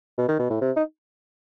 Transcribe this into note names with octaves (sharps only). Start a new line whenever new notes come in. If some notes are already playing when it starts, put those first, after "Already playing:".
B2
D#3
B2
A2
C3
D#4